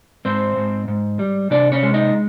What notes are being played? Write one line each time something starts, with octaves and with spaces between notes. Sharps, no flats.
G#2 C4 C5
G#2
G#2
G3
C3 D4 D5
C#4 C#5
G#3
D#4 D#5